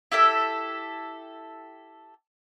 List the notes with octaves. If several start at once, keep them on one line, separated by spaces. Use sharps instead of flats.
E4 G4 A4 E5